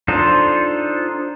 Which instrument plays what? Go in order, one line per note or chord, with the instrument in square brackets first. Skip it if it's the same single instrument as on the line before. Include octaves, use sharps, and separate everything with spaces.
[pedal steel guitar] D4 D#4 F4 A4 C5